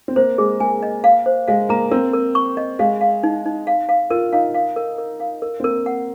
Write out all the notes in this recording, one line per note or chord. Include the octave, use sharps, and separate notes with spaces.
C4
A#3 C5
G#3 G#4
A#3 G#5
D#5
F5
C5
G#3 F5
A#3 A#5
C4 A#4
A#4
C#6
D#5
G#3 F5
F5
D#4
D#4
F5
F5
F4 A#4
D#4 F5
F5
A#4
A#4
F5
A#4
C4
A#3 A#4
F#5